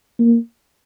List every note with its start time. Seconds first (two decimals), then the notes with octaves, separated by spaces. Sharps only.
0.19 A#3